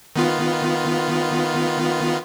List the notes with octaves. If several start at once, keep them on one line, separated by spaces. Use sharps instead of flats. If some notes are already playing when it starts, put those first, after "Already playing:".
D#3 B3 F4